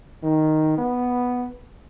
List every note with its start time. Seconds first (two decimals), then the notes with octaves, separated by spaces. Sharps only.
0.23 D#3
0.78 B3